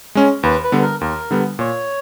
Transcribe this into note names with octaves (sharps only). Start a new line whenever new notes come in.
G#3 C#4
D#2 B4
B4
D3 G3 B3
A#4
D#2 A#4
D3 G3 B3
A#2 C#5